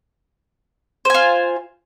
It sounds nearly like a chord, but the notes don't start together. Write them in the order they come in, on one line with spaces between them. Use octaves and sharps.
C5 G#5 F4